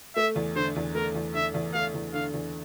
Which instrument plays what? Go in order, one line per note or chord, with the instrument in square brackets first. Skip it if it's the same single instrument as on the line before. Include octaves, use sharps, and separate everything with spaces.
[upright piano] A3 [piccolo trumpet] E5
[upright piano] E2
[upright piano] D3 [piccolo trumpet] C5
[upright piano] E2
[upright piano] A3 [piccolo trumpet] A#4
[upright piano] E2
[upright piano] D3 [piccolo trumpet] E5
[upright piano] E2
[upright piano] A3 [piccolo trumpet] F5
[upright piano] E2
[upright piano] D3 [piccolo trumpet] F5
[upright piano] E2